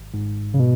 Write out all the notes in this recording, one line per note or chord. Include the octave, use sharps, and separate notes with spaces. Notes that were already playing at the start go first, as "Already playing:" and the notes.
Already playing: G#1
G#2
C#3
B2